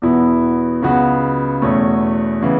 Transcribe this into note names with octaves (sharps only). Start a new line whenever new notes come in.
E2 B2 B3 E4
C#2 C#3 F#3 B3 F#4
E2 B2 A3 C#4
C#3 E3 B3